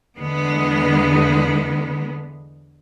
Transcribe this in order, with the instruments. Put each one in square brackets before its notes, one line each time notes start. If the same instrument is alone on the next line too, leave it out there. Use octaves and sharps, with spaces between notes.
[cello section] E2 D3 G#3 B3